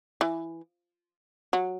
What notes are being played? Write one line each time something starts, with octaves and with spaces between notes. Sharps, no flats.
E3
F#3